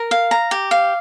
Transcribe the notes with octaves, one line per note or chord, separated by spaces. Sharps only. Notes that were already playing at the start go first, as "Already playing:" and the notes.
Already playing: A#4
F5
A#5
G4
F5